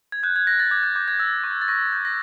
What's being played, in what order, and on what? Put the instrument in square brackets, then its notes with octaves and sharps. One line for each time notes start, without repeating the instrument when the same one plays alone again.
[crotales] G#6
F#6 G6
G#6
F#6 A#6
A6
D6 G#6
G6
D6 G6
G#6
E6 A6
C#6
A6
C#6 A#6
G6
A#6